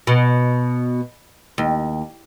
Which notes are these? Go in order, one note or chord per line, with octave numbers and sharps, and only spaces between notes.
B2
D#2